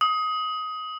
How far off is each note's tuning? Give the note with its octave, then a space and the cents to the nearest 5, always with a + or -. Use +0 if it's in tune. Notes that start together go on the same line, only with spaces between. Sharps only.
D#6 +20